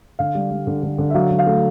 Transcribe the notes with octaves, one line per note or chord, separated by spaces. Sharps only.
D3 F5
G3
G3
D3
D3
D3
E5
F#3 F5
F#3
F5
A3